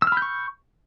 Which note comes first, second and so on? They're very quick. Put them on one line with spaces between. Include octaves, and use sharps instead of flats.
E6 F6 B5 G6 C#6